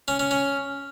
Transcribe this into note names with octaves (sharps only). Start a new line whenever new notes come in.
C#4
C#4
C#4